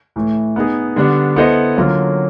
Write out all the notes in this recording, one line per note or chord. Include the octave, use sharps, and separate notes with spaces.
A2 E3 A3
B3 D#4 G#4
D3 G3 B3 D4
B3 E4 A4 C5 D#5
D3 F#3 A#3 C#4 F4